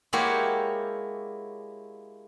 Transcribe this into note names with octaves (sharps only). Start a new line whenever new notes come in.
G#3 A#3 E4 F#4 G4 C#5